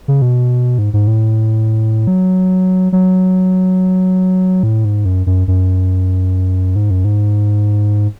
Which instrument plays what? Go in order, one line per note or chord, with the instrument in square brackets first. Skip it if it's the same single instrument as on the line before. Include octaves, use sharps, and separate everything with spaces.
[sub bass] C#3
B2
G#2
G#2
A2
F#3
F#3
A2
G#2
F#2
F#2
F#2
G#2
F#2
G#2